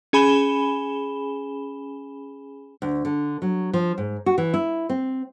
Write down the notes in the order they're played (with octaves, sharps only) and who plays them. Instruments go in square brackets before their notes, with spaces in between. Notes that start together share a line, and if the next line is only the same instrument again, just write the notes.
[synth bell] C#4 G#4 G#5 B5 E7 G7
[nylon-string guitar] D2
D3
F#3
F3
G#2
F#4
E3
E4
C4